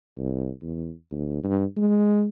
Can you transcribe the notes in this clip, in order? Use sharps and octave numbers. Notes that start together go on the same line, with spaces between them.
C2
E2
D2
G2
G#3